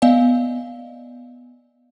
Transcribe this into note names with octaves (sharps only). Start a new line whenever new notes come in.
B3 D5 D#5 F5 G#5